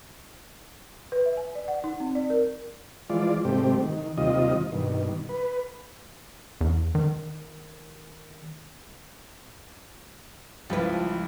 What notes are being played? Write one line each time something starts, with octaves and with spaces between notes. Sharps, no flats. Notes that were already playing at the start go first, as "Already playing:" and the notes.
B4
E5
G#5
D5
F#5
D#4
C4
D5
A#4
E3 F3 G#3 F4 D5
G#2 C3 G3 A3 C4 G4
D#3
D#2 C3 G3 F4 D#5
G2 B2 D#3
B4
E2
D#3
C#2 F3 G3 E4 B4